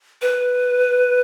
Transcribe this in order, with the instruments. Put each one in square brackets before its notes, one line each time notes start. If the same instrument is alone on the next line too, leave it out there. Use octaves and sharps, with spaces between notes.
[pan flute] B4